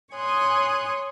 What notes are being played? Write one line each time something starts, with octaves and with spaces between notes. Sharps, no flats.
C#5 G#5 C6 D#6 F#6